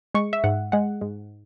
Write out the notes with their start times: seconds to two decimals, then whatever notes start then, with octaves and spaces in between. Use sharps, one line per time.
0.14 G#3 C#6
0.33 E5
0.44 G#2 F#5
0.72 G#3 F#5
1.01 G#2